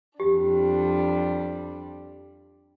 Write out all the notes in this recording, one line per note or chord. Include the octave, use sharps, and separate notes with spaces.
F2 G3 D4 G4